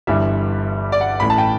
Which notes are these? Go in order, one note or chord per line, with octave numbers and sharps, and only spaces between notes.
G1 G2 E3 G3 E5
D5
F#5
A1 A2 E3 A3 B5
A5
G5